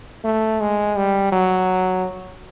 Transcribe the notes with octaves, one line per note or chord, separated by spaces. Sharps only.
A3
G#3
G3
F#3